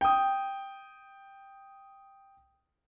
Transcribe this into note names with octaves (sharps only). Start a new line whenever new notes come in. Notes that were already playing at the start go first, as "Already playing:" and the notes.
G5 D#6